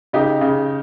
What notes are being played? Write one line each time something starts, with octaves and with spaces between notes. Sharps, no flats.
C#3 D#4 G4
C#3